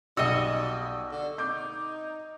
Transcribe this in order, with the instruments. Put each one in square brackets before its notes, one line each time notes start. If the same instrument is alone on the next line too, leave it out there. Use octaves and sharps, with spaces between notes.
[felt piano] B1 E6 [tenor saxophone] G3 [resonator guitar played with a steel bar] F#4 D#5
[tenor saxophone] D3
[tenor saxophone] D#4 [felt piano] D6 G6